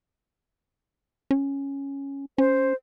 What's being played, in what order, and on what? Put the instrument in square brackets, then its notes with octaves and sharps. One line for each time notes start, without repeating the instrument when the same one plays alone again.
[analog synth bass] C#4
[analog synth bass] C#4 [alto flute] C5